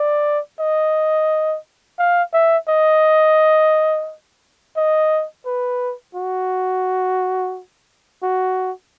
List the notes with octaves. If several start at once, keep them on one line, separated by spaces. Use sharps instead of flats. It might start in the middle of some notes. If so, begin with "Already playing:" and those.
Already playing: D5
D#5
F5
E5
D#5
D#5
B4
F#4
F#4